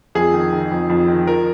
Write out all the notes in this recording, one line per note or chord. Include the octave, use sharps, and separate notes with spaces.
F2 G#4
D#3
D#3
F2
F2
D#3
F3 A#4